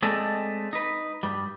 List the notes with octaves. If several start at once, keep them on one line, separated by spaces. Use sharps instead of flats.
G#3 A3 C4 A4 D5 D#5
D#4 B4
G2 G3